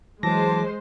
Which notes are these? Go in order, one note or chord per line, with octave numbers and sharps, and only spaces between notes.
E3 F#3 G#3 C5 A5 D6 A#6